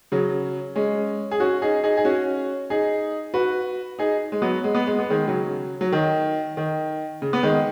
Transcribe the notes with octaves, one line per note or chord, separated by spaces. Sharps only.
C#3 F#3
G#3 C#4
G#4
C#4 F#4
D#4 G#4
D#4 G#4
G#4
C#4 F#4
D#4 G#4
F#4 B4
D#4 G#4
G#3
F#3 B3
G#3
B3
G#3
B3
D#3 G#3
C#3 F#3
F#3
D#3
D#3
C#3
B3
D#3 G#3